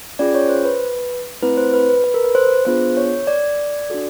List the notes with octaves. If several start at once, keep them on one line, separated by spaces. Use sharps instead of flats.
C#4 F4 G#4 D5
C#5
C5
B4
A3 C4 E4 B4
C5
B4
B4
B4
A#4
B4
C5
B3 D4 F4 G#4 C5
C#5
D5
D4 F#4 A4